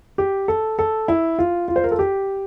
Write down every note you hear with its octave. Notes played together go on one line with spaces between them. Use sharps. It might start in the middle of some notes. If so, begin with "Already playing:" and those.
G4
A4
A4
E4
F4
F4
C5
A#4
A4
G4